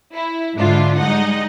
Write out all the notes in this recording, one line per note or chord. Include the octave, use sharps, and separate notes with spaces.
E4
G#2 D3 D4 E4 F4
G3 G#3 D#4 D#5 F#5